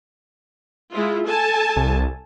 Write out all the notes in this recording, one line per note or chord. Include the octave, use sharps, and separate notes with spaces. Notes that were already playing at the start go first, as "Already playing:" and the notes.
G#3 E4 F4
A4 G#5 A5
C2